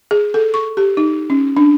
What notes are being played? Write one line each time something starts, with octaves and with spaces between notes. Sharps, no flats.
G#4
A4
C#6
G4
D#4
C#4
D4